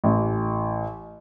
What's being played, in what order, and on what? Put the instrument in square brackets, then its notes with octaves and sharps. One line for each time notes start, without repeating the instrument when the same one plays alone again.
[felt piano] A1